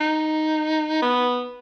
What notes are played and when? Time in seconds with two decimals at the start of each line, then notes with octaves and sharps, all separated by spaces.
0.01 D#4
1.02 B3